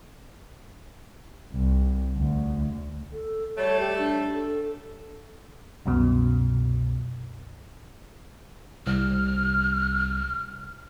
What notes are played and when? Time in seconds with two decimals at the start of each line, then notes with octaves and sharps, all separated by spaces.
1.54 C2
2.17 D2
3.13 A4
3.57 G3 A3 A4 C#5
3.80 G4
3.98 D4
4.33 A4
5.86 C2 F#2 B2
8.87 C2 F6